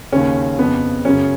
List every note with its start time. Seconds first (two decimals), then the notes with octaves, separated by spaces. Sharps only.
0.13 D#2 C#3 C#4
0.58 F2 C#3 B3
1.05 F#2 C#3 C#4